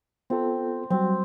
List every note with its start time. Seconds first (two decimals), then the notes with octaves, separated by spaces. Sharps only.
0.30 B3 C4 F4 A4
0.90 F#3 G3 C4 F#4